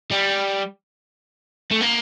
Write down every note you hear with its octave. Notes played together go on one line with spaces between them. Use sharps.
G3
A3
A#3